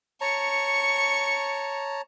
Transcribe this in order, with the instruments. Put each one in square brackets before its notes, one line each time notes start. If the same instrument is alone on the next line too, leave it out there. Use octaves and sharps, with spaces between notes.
[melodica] C#5 A5 A#5 [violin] C#6 C#7